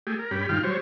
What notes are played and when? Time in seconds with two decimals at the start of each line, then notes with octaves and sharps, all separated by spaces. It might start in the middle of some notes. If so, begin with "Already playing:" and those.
0.07 A3 G4 G#4
0.19 A#4
0.31 G2 C#4 G4 B5
0.49 G2 D#3 F4 G5 F6
0.63 F#3 G3 C5 C#5